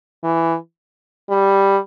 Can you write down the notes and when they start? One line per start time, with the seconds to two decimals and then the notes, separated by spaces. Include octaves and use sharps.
0.24 E3
1.30 G3